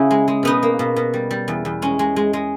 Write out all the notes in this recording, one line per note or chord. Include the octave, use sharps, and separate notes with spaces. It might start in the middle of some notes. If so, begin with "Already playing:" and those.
Already playing: C#3 C#4 E4
G#3
G#3
B2 B3 D#4
A#3
B2
B2
G3
G3
E2
E2
G#3 C#4
G#3
G#3
G#3